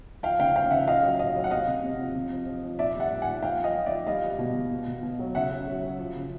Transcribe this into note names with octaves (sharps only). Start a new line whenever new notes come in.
F3 F5 G5
C#3 F5 G5
F3 F5 G5
C#3 E5 F#5
A#2 D#5 F5
F#3
A#2 D#5 F5
F#3
F#5
C3 D#5 F5
C3
C3
F3
C3
F3
F3
F3
A#2 D5 E5
G3
E5 F#5
A#2
F#5 G#5
A#2
F3 F5 G5
F3 D#5 F5
F3
F3 D5 E5
G3 D#5 F5
G3
B2
B2
B2
B2
B2
F#3
C#3 E5 F#5
F#3
F#3
F#3
F3
C#3